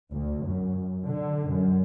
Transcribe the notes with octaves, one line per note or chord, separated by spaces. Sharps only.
D2
F#2
D3
F#2